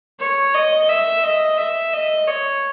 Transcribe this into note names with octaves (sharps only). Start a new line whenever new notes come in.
C#5
D#5
E5
D#5
E5
D#5
C#5